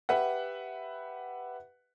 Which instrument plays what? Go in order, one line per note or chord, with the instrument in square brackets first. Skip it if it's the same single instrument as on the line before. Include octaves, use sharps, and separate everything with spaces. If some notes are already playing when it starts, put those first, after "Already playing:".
[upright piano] G4 B4 E5 F#5